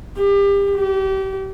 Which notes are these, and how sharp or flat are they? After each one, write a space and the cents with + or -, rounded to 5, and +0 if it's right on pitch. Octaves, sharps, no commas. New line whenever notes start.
G4 +30
G4 -30